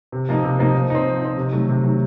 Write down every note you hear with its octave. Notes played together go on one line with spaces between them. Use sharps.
C3
F3 A#3 D#4
C3
F3 A#3 D#4
F3
C4 D#4
F3
C4 D#4
C3
D#3 F#3 A3
C3
D#3 F#3 A3